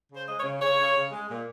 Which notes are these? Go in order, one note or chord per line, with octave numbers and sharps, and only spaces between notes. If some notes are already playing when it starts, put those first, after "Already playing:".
C#3
C5
G#3 D#5
C#5
C#3
C#3 C#5
C#3
C#3
G#3
A#2